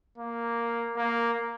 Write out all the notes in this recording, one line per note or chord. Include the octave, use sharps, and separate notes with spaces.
A#3
A#3